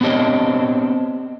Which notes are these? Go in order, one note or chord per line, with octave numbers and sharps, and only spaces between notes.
B3 C4 D4 G4 C#5 D#5